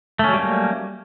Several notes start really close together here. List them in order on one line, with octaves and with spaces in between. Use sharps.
A3 C#4 F#3 G3 A#3